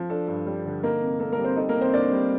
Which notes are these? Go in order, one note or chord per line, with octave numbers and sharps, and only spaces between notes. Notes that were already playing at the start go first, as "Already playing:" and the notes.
Already playing: F3
D4 A4
G2
G3
D3
A#3 D#4 A#4
C3
A#3 A4
A#3 A#4
G3
C4 C5
D#4 A4
A#3 A#4
C3
C4 C5
A#3 D4 D5
G3